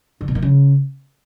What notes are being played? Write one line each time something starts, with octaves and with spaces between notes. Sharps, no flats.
D3
B2
D#3
C#3